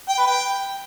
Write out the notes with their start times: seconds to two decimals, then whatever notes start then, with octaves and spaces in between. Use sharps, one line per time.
0.09 G5
0.18 B4
0.27 G5